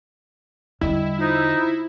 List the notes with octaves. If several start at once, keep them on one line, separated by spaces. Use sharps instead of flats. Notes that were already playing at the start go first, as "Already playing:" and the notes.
E2 D3 G3 E4 D#5
D#4 F4 C5